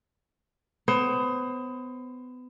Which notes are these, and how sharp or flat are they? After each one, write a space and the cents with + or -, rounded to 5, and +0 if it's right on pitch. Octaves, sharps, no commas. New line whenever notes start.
B3 +30 C5 +30